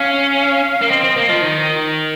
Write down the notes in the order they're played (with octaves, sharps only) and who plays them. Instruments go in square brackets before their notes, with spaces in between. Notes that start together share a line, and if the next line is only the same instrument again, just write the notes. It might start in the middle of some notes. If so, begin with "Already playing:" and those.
Already playing: [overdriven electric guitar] C#4 [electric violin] F5
[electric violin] F5
[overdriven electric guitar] A#3
[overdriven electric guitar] C4 [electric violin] D#5
[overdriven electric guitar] C4
A#3
F3
D#3